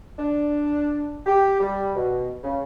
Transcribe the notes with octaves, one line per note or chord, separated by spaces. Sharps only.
D4
G4
G3
B2
C#3